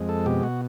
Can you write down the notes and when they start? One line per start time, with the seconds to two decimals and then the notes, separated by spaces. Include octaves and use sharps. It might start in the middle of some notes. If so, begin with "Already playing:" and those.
Already playing: F2 G#3
0.09 A4
0.26 B2 G4
0.43 F#4